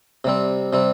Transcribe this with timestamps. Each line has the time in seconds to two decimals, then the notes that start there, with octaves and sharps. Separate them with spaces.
0.24 C3 G3 C4
0.73 C3 G3 C4